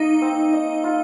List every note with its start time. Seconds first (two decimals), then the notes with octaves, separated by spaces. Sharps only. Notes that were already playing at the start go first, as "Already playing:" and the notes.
Already playing: A#3 D#4 D#5
0.22 C4
0.53 D#5
0.84 F4